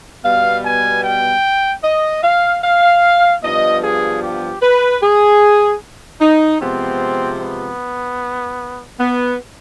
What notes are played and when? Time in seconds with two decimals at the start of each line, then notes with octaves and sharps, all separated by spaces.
0.25 B2 G3 B3 F5
0.65 G#5
1.04 G5
1.84 D#5
2.23 F5
2.64 F5
3.43 G2 F3 B3 D#5
3.84 G#4
4.23 G4
4.62 B4
5.03 G#4
6.21 D#4
6.61 C3 F3 G#3 B3 C4
7.41 B3
9.00 B3